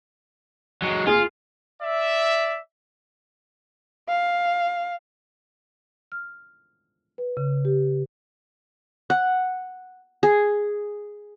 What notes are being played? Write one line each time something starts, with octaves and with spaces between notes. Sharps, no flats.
F#3 G#3
F4 G#4
D5 E5
F5
F6
B4
C#3
G4
F#5
G#4